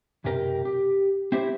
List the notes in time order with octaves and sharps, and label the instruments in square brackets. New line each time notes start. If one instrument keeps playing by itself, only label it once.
[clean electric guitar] B1 F#2 C3 G4 A#4 G5
G4
C4 E4 G4 C5